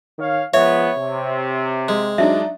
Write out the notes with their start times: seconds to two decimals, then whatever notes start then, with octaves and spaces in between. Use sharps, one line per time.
0.18 D#3 C#5 F5
0.54 F3 G#3 B3 C#5 E5
0.97 C3
1.88 G#3
2.18 F#3 D4 D#4 E5